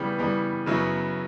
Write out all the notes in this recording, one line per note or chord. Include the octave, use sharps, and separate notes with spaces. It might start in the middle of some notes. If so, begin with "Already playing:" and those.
Already playing: C#3 E3 G3 B3
C#3 E3 G3 B3
F#2 C#3 F#3 B3 E4